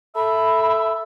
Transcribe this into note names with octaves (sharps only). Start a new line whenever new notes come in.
A4 E5 B5